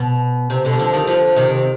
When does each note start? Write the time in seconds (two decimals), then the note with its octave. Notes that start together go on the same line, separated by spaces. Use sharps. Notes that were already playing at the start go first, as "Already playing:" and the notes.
Already playing: B2
0.50 C3
0.65 B2 D3
0.73 G3
0.79 D3 F3
0.94 D#3 G3
1.07 D3 F3
1.36 C3 D#3